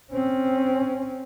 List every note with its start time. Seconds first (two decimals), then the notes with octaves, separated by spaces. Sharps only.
0.12 C4 C#4